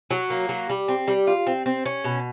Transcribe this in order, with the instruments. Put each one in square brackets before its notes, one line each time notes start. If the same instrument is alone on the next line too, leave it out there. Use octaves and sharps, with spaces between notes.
[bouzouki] F#3
A#3
F#3
G3
C4
G3
F4
C4
C4
C#4
B2